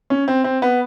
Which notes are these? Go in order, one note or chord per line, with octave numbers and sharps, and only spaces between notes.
C#4
C4
C4
B3